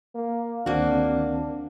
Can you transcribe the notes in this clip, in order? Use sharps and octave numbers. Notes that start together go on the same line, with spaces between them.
A#3
D2 D#3 A#3 C4 D4 F#4